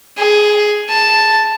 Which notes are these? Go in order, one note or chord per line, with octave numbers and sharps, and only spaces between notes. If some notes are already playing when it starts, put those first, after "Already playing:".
G#4
A5